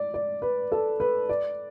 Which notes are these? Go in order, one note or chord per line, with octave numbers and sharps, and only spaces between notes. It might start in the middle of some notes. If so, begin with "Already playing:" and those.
Already playing: D5
D5
B4
A4
B4
D5